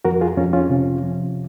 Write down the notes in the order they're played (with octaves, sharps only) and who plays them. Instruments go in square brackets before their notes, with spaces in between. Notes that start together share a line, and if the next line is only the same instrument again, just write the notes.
[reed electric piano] F2 F#4 A#4
F4 G#4
F2 C#4 F4
C#4 F4
C3
F3